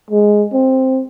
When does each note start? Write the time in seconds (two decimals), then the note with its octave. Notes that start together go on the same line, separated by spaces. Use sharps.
0.10 G#3
0.53 C4